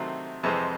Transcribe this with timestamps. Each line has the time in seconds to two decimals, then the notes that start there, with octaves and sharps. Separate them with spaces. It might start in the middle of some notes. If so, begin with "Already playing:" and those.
Already playing: C3 D#3 F#3 A3 C4
0.43 F2 C3 E3 G#3 C4